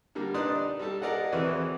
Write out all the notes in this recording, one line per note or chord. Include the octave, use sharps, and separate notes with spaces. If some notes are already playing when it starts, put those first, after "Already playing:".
D3 G3 A#3
D4 D#4 B4 D5 C6 D#6
G3 A4
G#4 A#4 D5 D#5 F#5
E2 E3 C4 F#4 B4